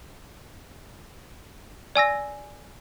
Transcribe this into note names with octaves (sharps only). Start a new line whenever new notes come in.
D5 G#5 E6 A#6